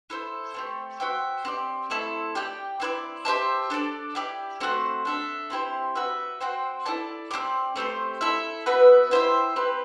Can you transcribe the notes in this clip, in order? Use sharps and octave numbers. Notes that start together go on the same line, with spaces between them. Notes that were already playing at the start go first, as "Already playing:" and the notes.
E4 A4 C5
A3 C4 G4
F#4 C5 E5 G5
C4 G4 D5
A3 C4 E4 A4
G4 D5 G5
C4 E4 B4 D5
G4 C5 E5 A5
D4 A4 D5
E4 G4 D5
A3 C4 F#4 C5
D4 A4 E5
C4 E4 G4 C5
F#4 B4 E5
C4 F#4 C5 G5
E4 A4 D5 A5
C4 E4 G4 D5
A3 C4 G4 C5
E4 A4 E5
B3 F#4 B4 E5
E4 G4 C5 E5
C4 G4 B4